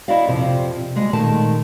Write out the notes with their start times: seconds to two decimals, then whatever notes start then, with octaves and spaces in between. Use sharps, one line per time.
0.08 E4 F#4 D5 D#5 F5
0.27 F2 C3 F3
0.95 D2 G3 G#3
1.13 A#2 D#3 G#3 A3 A5